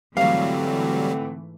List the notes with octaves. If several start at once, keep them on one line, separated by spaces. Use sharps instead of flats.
G#2 D3 E3 F#3 G3 A3 C4 F5